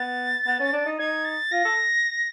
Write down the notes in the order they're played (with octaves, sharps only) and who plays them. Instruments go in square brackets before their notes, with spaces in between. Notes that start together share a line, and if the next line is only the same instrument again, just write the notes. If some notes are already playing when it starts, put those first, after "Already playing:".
Already playing: [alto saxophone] B3 [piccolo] A6
[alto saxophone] B3
C#4
D4
D#4
[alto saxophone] D#4 [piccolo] G#6
[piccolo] A6
[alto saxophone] F4 [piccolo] A#6
[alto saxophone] A4